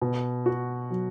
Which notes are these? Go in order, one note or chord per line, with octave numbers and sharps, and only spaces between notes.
B2
F#4
F#3